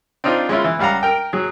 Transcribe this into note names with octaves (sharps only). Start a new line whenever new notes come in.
C4 D4 D#4 F4
G#3 C#4 E4 F4
E3
C#2 G3 F5 F#5 A#5
A#4 G5
F#3 G#4